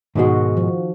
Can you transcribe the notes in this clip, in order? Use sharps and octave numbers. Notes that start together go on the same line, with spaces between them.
G#2 B2 D#3 G#3 F#4
F3